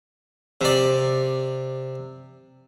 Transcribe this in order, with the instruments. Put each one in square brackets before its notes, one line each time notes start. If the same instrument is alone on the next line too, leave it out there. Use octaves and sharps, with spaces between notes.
[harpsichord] C3 D5